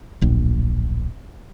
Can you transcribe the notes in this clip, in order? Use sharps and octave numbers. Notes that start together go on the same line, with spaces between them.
D1 A#1